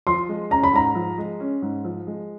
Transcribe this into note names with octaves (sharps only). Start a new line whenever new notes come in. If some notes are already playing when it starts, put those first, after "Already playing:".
F3 C6
G#3
C#4 A#5
B5
G#2 A#5
F3
G#3
C#4
G#2
F3
G#3